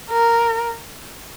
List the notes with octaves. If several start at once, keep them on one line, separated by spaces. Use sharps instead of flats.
A#4